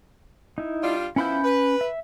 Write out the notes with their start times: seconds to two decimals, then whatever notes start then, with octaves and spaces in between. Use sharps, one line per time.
0.58 D#4 E4
0.83 G3 D4 F4
1.16 F3 B3 C#4 E4 B5 G6
1.44 B4
1.81 E5